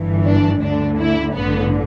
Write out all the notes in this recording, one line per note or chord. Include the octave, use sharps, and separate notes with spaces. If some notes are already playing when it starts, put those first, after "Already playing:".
Already playing: G1 G2 E3
D4
D2 D3 D4
E4
A1 G2 D3 B3